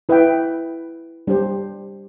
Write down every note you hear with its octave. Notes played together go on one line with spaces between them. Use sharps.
E4 B4 E5 G5
G3 D4 G4 C5